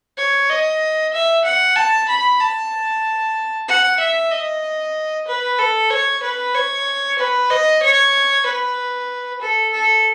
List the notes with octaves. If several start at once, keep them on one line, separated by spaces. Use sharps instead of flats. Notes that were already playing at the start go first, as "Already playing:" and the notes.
C#5
D#5
E5
F#5
A5
B5
A5
F#5
E5
D#5
B4
A4
C#5
B4
C#5
B4
D#5
C#5
B4
A4
A4